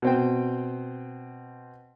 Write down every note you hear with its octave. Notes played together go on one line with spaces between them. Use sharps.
B2 C4 G5